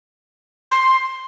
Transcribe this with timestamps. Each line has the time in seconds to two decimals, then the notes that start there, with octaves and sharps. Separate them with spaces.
0.71 C6